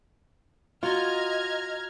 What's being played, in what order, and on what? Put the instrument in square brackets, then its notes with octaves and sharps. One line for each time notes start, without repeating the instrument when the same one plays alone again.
[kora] F4 [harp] F#4 [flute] D#5 [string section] A#5 F6 G#6